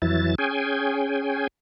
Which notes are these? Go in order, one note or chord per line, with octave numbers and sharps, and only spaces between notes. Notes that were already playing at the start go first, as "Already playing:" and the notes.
F2 E3 F#3 E4 A6
C#4 G#4 G5 G#5